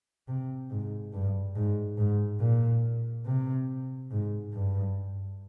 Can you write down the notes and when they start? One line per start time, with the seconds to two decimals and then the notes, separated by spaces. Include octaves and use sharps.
0.28 C3
0.70 G#2
1.13 G2
1.55 G#2
1.98 G#2
2.40 A#2
3.26 C3
4.11 G#2
4.53 G2